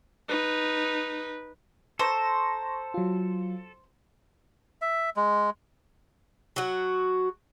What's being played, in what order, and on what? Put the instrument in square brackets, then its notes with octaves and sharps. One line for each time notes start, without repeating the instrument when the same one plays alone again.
[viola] D#4 B4
[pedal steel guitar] A4 [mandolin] C5 [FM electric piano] A#5 C#6 A#6
[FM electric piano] F#3 F4
[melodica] E5
G#3
[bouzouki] F#3 F#4